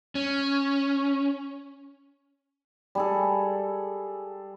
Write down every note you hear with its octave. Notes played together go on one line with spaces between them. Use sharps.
C#4
G3 G#4 A4